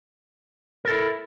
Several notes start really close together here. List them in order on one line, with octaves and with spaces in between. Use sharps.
A#4 A4 E4